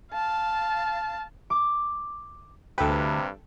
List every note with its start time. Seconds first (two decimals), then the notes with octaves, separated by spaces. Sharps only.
0.12 F5 A5
1.50 D6
2.78 D2 G2 C3 A4 B4 G5